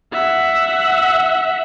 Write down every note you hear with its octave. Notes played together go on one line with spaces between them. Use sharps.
E5 F#5